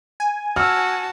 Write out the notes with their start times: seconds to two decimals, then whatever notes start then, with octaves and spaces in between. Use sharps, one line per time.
0.20 G#5
0.56 F#4 A5 E6 F6